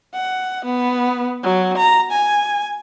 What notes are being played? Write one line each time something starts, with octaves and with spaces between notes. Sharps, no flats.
F#5
B3
F#3
A#5
G#5